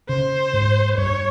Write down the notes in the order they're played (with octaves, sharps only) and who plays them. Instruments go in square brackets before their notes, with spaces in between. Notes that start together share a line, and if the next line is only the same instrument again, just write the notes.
[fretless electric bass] C#3 [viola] C5
[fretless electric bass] G#2
[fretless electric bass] G2 [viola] C#5